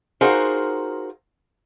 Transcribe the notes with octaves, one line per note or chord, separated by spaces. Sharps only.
D#4 F4 F#4 G#4 A#4 C5